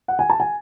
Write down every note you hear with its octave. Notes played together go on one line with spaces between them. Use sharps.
F#5
G#5
A5
G#5